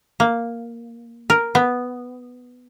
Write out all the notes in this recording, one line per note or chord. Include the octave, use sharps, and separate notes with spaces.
A#3
A#4
B3